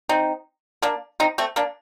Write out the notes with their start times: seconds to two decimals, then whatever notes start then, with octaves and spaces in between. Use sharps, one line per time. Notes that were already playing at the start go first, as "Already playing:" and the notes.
0.09 C4 D#4
0.82 A#3 D4
1.20 C4 D#4
1.38 A3 C4
1.56 A#3 D4